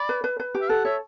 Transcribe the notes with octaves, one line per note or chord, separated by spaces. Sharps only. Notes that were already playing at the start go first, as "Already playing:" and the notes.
Already playing: D5 B5
B4
B4
B4
G4
E5
A4 F#5
C#5 E5